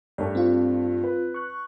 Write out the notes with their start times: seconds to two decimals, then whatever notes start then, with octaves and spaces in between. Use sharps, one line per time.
0.18 G2 A3 C#5
0.35 C4 F4
1.03 B4
1.34 C#6 F#6